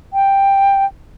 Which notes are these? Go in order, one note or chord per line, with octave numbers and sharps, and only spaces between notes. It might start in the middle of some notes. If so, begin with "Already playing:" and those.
G5